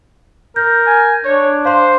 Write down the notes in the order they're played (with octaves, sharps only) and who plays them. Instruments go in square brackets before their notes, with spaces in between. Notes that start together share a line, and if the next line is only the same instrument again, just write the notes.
[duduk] A#4 [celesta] G6
[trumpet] G#5
[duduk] D4 [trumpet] C#5
[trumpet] C5 [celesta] F5 C6